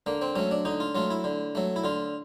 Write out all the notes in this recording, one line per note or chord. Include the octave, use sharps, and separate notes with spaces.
D3 A#3
C4
F#3 A3 C#4
D4
D3 D#4
F4
F#3 A3 F4
E4
D3
F#3 A3
E4
D3 F4